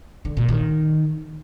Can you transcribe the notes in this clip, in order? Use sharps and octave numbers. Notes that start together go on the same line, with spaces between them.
D3
A#2
D#3